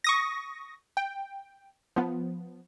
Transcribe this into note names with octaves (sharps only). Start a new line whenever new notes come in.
C#6 D#6 A#6
G5
F3 B3